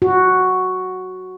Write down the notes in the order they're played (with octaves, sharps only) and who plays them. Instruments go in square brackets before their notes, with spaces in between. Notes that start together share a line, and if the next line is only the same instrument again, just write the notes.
[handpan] F#4